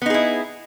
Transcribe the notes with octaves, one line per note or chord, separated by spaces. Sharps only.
B3 D#4 E4 G#4